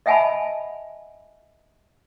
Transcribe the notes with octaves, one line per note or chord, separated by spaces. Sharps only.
D#5 E5 F#5 G#5 A5 B5